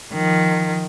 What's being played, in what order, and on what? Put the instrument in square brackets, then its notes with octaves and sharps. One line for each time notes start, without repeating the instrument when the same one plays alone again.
[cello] D#3 F3